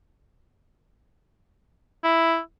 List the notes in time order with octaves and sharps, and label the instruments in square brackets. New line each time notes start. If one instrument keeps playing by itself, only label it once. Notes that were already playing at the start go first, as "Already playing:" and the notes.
[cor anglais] E4